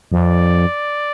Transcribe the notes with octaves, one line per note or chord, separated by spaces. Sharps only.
F2 D5